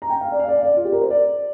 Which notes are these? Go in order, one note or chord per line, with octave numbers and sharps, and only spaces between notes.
A#5
G5
F5
D5
F5
D5
F5
D5
F4
G4
A#4
C5
D5